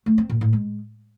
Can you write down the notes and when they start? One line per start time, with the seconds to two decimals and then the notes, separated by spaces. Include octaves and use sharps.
0.06 A3
0.18 C4
0.29 A#2
0.41 A2
0.53 G#3